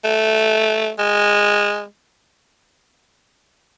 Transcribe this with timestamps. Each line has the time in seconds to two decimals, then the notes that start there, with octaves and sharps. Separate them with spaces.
0.04 A3
0.99 G#3